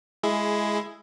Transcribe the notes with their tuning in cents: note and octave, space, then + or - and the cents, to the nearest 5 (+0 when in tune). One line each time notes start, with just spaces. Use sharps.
G#3 +15 E4 +15 G#4 +0